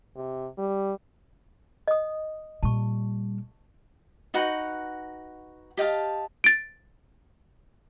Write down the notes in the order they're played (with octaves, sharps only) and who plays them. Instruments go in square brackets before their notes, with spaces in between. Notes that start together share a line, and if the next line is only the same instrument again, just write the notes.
[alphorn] C3
G3
[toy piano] D#5 D#6
[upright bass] A#2 G3 [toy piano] A5 C#6
[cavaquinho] D#4 F#4 B4 F#5
G4 D#5 F5 A5
[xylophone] A6 D7